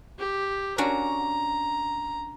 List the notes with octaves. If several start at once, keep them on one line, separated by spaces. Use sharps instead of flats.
G4
C#4 D4 F#4 A#5